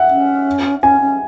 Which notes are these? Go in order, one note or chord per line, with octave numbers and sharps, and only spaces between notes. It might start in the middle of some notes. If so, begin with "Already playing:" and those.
Already playing: E5 F#5
C#4
C#4 G#5
C#4